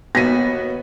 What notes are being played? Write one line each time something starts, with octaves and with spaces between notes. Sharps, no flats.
D#2 B3 F#4 A#6 B6 D#7